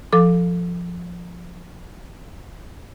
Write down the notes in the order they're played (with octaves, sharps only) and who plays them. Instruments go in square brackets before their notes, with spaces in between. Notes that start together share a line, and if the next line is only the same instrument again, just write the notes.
[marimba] F3 A4 D6